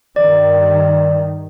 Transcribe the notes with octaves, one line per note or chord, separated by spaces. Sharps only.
G2 D#3 D5